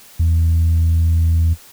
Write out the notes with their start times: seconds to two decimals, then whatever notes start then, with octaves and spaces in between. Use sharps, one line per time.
0.19 E2